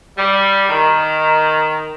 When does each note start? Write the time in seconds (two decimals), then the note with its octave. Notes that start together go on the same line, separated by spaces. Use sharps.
0.18 G3
0.69 D#3